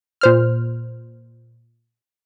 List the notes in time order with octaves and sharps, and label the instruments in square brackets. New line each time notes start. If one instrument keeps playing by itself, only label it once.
[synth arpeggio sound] A#2 C5 F6